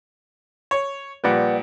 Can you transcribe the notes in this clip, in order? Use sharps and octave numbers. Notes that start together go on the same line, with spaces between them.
C#5
A#2 F3 G3 B4 D5 F#5